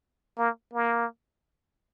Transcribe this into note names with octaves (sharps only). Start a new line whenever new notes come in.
A#3
A#3